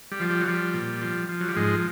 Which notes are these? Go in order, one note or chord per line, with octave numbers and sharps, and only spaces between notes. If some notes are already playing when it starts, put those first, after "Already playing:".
G3
F3
G3
F#3
F3 G3
A#2
F3
F3
F#3
G3
G#2 F3 G#3